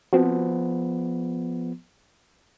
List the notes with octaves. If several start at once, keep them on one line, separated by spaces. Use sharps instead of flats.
F3 B3 C4 F#4